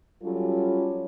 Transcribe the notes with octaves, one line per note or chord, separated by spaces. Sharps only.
F#3 G3 C#4 F4 A4